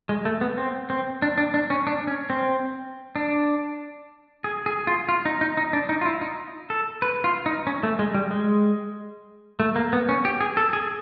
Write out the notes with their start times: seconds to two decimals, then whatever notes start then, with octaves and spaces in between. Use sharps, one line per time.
0.09 G#3
0.25 A3
0.41 B3
0.58 C4
0.90 C4
1.22 D4
1.38 D4
1.54 D4
1.70 C#4
1.87 D4
2.07 C#4
2.30 C4
3.16 D4
4.44 G#4
4.66 G#4
4.87 F4
5.09 F4
5.25 D#4
5.41 D#4
5.57 D#4
5.73 D4
5.89 D#4
6.01 F4
6.05 E4
6.21 D#4
6.70 A4
7.02 B4
7.24 F4
7.46 D#4
7.67 C#4
7.83 A3
7.99 G#3
8.15 G3
8.31 G#3
9.60 A3
9.76 A#3
9.93 B3
10.09 C#4
10.25 G4
10.41 G#4
10.57 A4
10.73 G#4